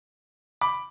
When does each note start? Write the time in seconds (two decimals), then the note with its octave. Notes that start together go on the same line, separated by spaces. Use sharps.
0.61 B5 D6